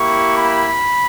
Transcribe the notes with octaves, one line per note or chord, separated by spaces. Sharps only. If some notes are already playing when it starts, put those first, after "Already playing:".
Already playing: A#3 E4 G4 C#6
B5